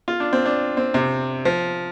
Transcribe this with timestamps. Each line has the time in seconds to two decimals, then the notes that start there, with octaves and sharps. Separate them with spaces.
0.08 F4
0.20 D4
0.33 C4
0.46 D4
0.77 C4
0.94 C3
1.45 F3